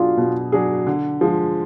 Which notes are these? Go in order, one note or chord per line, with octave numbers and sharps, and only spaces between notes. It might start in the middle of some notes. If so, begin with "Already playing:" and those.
Already playing: B2 F#3 D4 F4 G#4
B2
F#3 D4 G#4
D3
F3 G#3